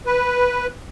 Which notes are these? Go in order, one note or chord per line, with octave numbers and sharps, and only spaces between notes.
B4